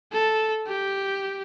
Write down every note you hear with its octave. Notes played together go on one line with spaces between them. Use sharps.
A4
G4